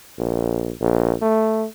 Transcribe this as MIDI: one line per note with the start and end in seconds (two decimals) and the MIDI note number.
0.18 0.71 34
0.80 1.13 34
1.22 1.66 57